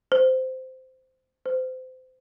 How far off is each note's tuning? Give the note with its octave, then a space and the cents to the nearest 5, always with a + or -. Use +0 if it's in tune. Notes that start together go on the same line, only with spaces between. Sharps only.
C5 -15
C5 -30